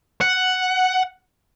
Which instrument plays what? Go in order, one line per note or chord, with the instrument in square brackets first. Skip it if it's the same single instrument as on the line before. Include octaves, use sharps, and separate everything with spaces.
[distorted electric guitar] F#5